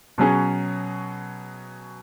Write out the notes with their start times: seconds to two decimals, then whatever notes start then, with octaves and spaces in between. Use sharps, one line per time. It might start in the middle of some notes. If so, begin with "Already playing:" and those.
0.18 B2 F#3 C#4 G#4